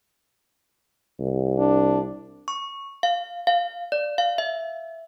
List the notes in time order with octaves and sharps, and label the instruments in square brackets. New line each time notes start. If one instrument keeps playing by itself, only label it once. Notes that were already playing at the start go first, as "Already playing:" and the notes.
[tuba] C2
[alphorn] D4
[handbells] C#6
F5
F5
D5
F5
E5